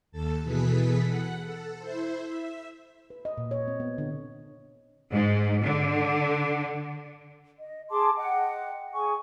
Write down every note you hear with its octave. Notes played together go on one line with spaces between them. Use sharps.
D#2 A4 A5
B2 E3 G#4 A4 B4 B6
F#5
A4
E4 C5
E5
B4
D#5
A#2
C#5
C4
B3
D3
G#2
D3
D#5
G#4 A5 C6 D6
D#5 F#5 G5
G#4 G#5 C#6